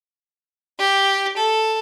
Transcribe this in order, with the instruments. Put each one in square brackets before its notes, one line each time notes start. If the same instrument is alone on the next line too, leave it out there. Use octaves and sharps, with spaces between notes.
[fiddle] G4
A4